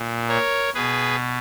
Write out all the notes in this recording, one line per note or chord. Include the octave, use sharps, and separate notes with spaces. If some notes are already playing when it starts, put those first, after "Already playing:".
Already playing: A#2
A#4 C#5
B2 G#4 B4